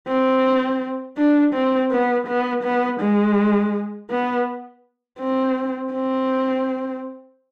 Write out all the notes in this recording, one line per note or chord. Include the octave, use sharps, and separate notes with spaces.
C4
D4
C4
B3
B3
B3
G#3
B3
C4
C4